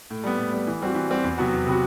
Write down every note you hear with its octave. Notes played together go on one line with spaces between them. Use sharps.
A2
G3 B3
A2
G3 B3
E3
G3 C4 F#4
E3
G3 C4 F#4
E2
C3 F#3 B3 F#4
E2
C3 F#3 B3 F#4